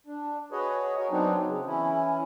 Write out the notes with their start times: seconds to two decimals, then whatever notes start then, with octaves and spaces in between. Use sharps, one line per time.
0.07 D4
0.52 F#4 G#4 B4 C#5 D#5
0.98 F#4 A#4 C#5
1.11 F#3 B3 C4 D4 D#4
1.47 C#3
1.67 E3 C#4 E4